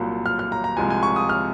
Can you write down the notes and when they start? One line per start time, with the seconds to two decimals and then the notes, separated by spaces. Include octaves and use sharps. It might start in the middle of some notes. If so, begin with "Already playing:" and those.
Already playing: C2 A#2 F#3
0.26 F6
0.39 F6
0.52 A#5
0.64 A#5
0.77 C2 C3 F3 G#3 G#5
0.90 G#5
1.03 C#6
1.16 D#6
1.29 F6